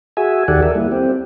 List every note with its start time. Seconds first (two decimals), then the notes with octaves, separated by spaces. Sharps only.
0.17 F#4 G#4 E5 G#5
0.48 D#2 D#3 G4 A4 D5 F#5
0.63 A4 A#4 D5 E5
0.75 G3 A#3 E4
0.92 C4 G4